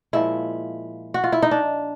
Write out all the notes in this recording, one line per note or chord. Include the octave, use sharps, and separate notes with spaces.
A#2 F3 G#3 E4
F#4
F4
E4
D#4
D4